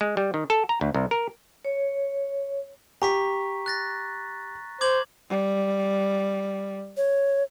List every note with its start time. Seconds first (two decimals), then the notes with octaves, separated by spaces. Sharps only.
0.01 G#3
0.17 G3
0.34 D#3
0.50 A4
0.69 A#5
0.81 D2
0.95 C2
1.11 A#4
1.65 C#5
3.02 G4 A#5 C#6 B6
3.66 F#6 A6 A#6
4.81 C5 D6 G#6 F#7
5.30 G3
6.97 C#5